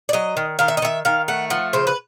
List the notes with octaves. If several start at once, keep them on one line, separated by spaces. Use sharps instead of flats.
D5
F#3 D#5
D#3
D#3 F5
E5
D#5
D#3 E5
D#3 F5
A3 F#5
F3 F#5
C#3 C5
B4